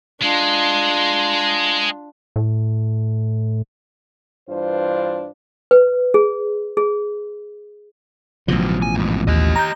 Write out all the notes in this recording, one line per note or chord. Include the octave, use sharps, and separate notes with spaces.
G#3 D4 F4
A2
G2 E3 D4 F4 C5
B4
G#4
G#4
A1 B2 D3 F3 F#3
G#5
F2 G#2
D#2 G4 D#5
A#5 G6